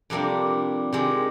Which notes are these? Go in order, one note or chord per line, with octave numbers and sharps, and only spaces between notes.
F2 C3 G3 A#3 D4
C3 D#3 G#3